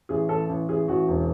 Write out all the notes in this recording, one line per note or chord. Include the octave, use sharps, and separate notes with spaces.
A1 G#4
A1 A4
A1
A1 G#4
A1 F#4
E1